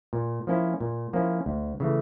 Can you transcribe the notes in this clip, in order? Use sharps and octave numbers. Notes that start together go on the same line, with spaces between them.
A#2
F3 A#3 C#4 E4
A#2
F3 A#3 C#4 E4
D2
C#3 E3 A3